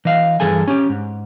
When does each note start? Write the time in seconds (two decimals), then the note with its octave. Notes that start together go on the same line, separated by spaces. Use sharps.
0.05 E3 D#5 F5
0.40 G2 E3 G#4 A4 G#5
0.68 C#4 G4
0.89 G#2